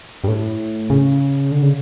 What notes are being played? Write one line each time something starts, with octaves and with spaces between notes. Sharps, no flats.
G2
A2
C#3
D3
C#3